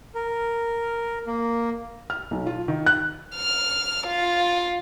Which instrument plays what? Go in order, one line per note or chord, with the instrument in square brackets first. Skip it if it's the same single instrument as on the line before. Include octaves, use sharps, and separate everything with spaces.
[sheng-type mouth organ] A#4
A#3
[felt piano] F6
B1
F4
D#3
F#6
[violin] F6
F4